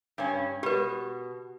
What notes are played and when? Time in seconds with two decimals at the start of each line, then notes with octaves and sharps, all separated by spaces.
0.18 G2 C#4
0.63 B2 G4 B4